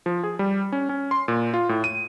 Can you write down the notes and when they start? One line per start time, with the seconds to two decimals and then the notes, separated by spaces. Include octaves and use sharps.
0.06 F3
0.23 G#4
0.39 G3
0.72 C#4
0.89 C#4
1.11 C6
1.28 A#2
1.54 F4
1.69 A2
1.84 D#7